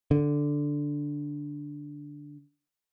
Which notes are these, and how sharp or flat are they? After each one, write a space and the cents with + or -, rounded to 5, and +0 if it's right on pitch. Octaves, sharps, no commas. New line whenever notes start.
D3 -5